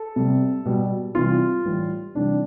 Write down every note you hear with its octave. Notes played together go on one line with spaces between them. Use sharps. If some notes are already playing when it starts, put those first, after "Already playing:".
Already playing: A4
C3 G3
B2 G3
C3 E3 G3 F4
A2 E3 G3
C3 E3 G3 D4